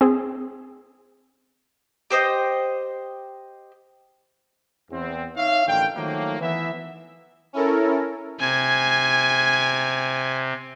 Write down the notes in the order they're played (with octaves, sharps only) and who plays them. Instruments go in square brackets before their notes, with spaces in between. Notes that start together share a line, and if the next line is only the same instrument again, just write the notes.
[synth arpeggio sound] C4 G#4
[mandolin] G4 C5 D#5
[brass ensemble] E2 C4
D#4 C#5 E5 F5
A1 D3 D#3 G5
D#3 F3 F#3 A3 A#3
E3 B3 E5
[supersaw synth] C#4 E4 A4 A#4
[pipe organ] C3 [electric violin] G#5 G#6